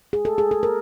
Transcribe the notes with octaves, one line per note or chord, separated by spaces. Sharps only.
G#4
A4
G#4
A4
A#4